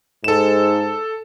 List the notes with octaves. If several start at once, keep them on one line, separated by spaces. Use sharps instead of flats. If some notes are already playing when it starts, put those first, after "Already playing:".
G#2 A4 E7